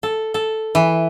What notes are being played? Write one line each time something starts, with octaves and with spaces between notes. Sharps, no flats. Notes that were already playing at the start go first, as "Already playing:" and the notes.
A4
A4
E3